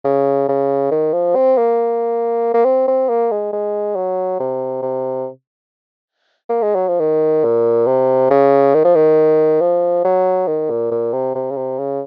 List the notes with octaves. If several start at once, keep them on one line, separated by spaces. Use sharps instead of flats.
C#3
C#3
D#3
F3
C4
A#3
A#3
C4
C4
A#3
G#3
G#3
F#3
C3
C3
A#3
G#3
F#3
F3
D#3
A#2
C3
C#3
D#3
F3
D#3
F3
F#3
D#3
A#2
A#2
C3
C3
C#3
C3
C#3